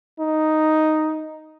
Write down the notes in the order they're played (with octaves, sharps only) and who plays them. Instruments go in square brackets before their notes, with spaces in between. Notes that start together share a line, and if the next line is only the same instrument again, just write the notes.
[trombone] D#4